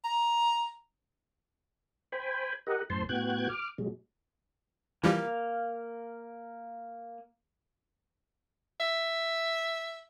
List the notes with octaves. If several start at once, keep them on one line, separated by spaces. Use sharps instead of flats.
A#5
C5 G5 G#5 B5
G4 A#4 D#5 F#5
F#2 A2 C5 A5 C6
A2 B3 F#4 G5 F#6 G#6
D6 F6
A#2 F#3 G#3
E3 F3 G3 A#3 F5
E5